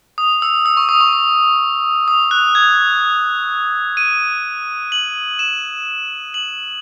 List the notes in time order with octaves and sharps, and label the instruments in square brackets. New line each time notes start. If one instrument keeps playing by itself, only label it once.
[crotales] D#6
E6
E6
C#6
D#6
C#6
C#6
D#6
F#6
G#6
D#7
F#7
E7
F#7